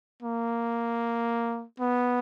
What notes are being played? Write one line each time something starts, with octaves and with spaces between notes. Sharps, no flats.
A#3
B3